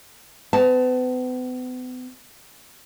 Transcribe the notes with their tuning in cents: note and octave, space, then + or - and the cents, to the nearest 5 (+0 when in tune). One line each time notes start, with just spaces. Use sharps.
B3 +40 A5 -10